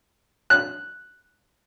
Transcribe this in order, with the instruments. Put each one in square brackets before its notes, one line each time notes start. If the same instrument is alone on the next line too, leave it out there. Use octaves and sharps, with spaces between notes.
[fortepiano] F#6